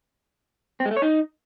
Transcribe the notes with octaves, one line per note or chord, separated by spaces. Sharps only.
C4
G#3
A3
C#5
D#4